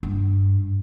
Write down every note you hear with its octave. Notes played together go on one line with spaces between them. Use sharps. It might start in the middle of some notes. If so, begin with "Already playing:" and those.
G2